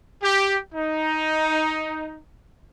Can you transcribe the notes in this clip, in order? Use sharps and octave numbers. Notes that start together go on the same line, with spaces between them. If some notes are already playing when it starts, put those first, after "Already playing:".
G4
D#4